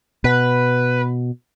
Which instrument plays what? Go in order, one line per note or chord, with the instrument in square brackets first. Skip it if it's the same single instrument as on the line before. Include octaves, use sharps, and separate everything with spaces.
[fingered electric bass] B2 [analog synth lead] B4